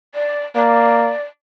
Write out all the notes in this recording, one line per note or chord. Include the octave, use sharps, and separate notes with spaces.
D5
A#3 D5